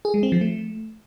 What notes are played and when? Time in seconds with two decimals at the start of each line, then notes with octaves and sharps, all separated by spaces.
0.05 G#4
0.14 G#3
0.23 C4
0.32 F3
0.41 A3